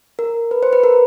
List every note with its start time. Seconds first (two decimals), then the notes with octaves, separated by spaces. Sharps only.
0.19 A#4
0.51 B4
0.63 C5
0.73 B4
0.84 A#4